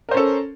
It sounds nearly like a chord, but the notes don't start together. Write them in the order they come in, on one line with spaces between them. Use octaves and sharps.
A#4 C5 C#4 A4